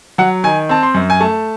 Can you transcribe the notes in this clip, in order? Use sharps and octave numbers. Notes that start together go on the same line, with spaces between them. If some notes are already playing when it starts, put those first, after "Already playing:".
F#3 F#5
D#3 G#5
C4 A5
C6
F#2
G#5
A3 A5